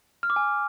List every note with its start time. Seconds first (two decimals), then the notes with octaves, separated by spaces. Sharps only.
0.23 F6
0.30 D6
0.36 G#5